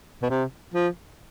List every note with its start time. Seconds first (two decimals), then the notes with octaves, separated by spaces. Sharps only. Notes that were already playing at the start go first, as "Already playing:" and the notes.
0.23 B2
0.30 C3
0.74 F3